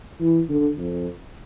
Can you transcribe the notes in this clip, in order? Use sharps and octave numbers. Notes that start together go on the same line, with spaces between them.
E3
D3
F2